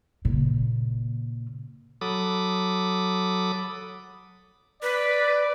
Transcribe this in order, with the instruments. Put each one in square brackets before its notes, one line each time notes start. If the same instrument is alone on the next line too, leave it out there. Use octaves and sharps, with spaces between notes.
[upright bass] A#2 C#3
[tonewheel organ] F#3 A4 B5 D6 D#6
[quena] B4 [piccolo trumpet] D5